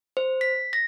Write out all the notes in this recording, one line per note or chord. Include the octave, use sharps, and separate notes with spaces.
C5
B6
A#6